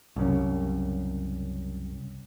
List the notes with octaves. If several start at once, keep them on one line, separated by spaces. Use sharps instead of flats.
C2 F#2 C#3